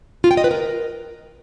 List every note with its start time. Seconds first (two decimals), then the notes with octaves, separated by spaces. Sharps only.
0.24 F4
0.31 G5
0.37 D#5
0.44 B4
0.51 A#4